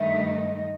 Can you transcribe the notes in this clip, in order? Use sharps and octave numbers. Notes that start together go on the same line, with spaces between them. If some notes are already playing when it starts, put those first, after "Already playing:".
Already playing: G2 D#3 A3 D#4 E5
D#5
D#5
D#5